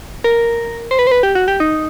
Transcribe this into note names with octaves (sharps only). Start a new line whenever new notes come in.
A#4
C5
B4
C5
B4
G4
F#4
G4
D#4